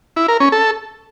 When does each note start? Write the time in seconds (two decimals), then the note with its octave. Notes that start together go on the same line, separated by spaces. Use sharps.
0.16 E4
0.28 A#4
0.40 C#4
0.52 A4